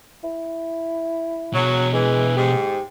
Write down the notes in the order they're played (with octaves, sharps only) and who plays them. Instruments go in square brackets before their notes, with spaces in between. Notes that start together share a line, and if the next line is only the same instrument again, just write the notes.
[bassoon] E4
[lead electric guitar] B2 G#4 [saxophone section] F#3
[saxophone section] E3 [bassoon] G#3
[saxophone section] G#2 [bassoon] G4